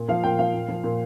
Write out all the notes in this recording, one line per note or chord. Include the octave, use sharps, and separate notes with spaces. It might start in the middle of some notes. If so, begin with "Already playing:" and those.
Already playing: A#2
F3 F5
A#2 G5
F3 F5
A#2
F3
A#2